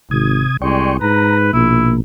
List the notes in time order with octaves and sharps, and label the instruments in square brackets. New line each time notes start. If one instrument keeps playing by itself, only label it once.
[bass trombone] G#1 [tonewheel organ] C3 D#6 G#6
[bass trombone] C2 [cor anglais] G#3 [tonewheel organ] D5 G5 C#6
[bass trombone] G#2 [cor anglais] B4 [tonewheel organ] A#5
[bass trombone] A#1 [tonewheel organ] B2 A#3 [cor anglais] E4